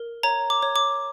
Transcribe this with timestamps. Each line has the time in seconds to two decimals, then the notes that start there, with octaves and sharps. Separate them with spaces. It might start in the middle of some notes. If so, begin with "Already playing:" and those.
Already playing: A#4
0.23 C#5 A#5
0.50 D6
0.62 C#5
0.76 D6